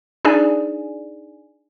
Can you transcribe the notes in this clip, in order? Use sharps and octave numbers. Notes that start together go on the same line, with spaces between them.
D4 D#4 G#4 D5 G#5